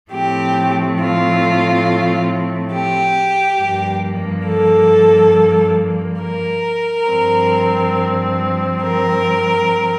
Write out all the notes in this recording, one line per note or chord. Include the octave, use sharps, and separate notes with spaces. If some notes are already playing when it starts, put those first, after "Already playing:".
A2 F3 A3 C4 G4
F4
G4
G2 F3 A#3
A4
A#4
G2 F3 C4
A#4